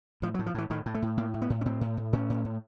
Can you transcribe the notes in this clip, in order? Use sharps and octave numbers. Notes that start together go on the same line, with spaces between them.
A2 F3
F#3
A2
F3
A2 E3
A2 D#3
A2
A3
A2
A2 A#3
A2
B3
A2
C#4
A2 C4
A2
A2
A2 C#4
A2
A2